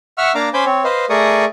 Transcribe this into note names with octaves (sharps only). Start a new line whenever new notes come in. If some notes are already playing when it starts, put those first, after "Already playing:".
E5 F#5 C#6 E6 F6
A#3 D4 F5 A#5 D6
C#4 C5 G#5 B5 D6 G6
C4 C#5
B4 C5 D#5 F5
A3 G#4 A#4 D5 C#6 D#6